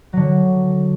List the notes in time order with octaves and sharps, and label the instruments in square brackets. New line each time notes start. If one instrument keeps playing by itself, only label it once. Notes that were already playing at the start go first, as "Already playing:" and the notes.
[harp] D3 F#3